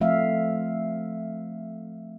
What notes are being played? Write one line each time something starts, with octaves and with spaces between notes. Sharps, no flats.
F3 A3 C4 E5 F5